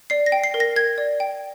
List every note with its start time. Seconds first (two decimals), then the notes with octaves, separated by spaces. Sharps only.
0.10 D5 C7
0.26 A#6
0.32 G5
0.44 C7
0.54 A#4
0.60 A#6
0.76 A#4 G#6
0.98 D5
1.20 G5